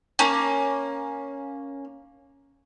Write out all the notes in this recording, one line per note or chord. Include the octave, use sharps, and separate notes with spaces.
A#3 C#4